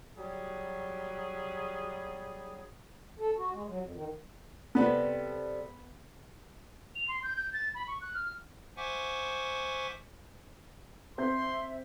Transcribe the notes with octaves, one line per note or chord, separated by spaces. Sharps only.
F#3 G3 G#4
A4
F#4
G#3
F#3
F2
D#3
C3 G3 B3 A4
F7
C6
G6
G6
A6
B5
C#6
F#6
F6
C5 E5 F#5 G#5 C#6 D6
C4 E5 C6 G6